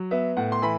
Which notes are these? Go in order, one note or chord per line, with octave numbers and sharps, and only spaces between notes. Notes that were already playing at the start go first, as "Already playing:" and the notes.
Already playing: F#3
B3 E5
A2 F#5
C6
E3 B5